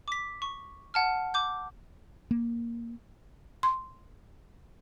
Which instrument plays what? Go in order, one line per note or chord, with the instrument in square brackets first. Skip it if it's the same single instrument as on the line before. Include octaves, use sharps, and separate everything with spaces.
[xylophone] D6 B6
C#6
F#5 A5 F6
D6 G6
[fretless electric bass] A#3
[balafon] C6